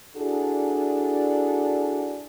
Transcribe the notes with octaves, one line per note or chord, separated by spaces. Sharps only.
D4 E4 F#4 G#4 A4 D5